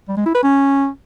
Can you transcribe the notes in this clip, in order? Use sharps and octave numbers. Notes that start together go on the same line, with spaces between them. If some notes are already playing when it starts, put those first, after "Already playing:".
G3
G#3
E4
B4
C#4